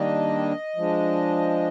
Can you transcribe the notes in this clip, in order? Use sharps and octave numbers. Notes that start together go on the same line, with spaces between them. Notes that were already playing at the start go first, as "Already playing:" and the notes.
Already playing: D#3 G3 A#3 D4 D#5
F3 G#3 D4